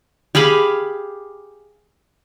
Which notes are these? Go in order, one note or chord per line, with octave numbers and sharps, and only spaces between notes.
G4 G#4 F5 B5